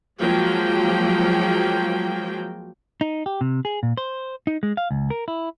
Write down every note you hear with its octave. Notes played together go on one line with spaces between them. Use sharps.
F3 F#3 G#3 A#3 G5
D#4
G4
C3
G#4
A#2
C5
D#4
G#3
F5
C#2
A#4
E4